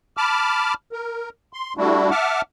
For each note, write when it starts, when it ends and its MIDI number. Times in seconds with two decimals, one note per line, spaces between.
0.17 0.74 81
0.17 0.74 83
0.17 0.74 86
0.17 0.74 89
0.93 1.29 70
1.53 1.74 84
1.77 2.10 55
1.77 2.10 57
1.77 2.10 62
1.77 2.10 64
1.77 2.10 66
2.11 2.41 76
2.11 2.41 78
2.11 2.41 81
2.11 2.41 86
2.11 2.41 89